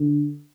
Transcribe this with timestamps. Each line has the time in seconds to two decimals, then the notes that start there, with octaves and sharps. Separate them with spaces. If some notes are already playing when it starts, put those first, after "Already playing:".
Already playing: D3